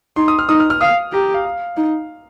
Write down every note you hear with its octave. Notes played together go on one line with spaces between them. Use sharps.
D#4 C6
D#6
F6
D#4 D#6
F6
F6
F5 D#6
G4 A#5
F5
F5
D#4